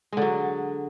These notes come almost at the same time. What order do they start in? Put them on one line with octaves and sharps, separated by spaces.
G#3 D3 F#3